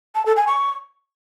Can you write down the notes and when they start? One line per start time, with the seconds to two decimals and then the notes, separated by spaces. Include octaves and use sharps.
0.15 A5
0.26 A4
0.36 G#5
0.47 C#6